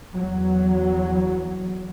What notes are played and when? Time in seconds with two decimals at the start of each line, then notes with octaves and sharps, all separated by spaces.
0.17 E2 F#3